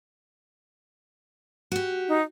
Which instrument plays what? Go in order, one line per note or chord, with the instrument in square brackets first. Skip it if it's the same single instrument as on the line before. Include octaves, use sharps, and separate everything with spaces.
[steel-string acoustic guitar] F#4 G4
[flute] D#4